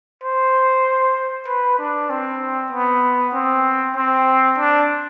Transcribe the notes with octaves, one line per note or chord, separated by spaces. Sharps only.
C5
B4
D4
C4
B3
C4
C4
D4